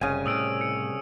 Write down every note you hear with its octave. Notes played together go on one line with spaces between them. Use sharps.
F#1 C2 C#3 G#5 D#7
A2 C3 D#6 E6 D7
C#7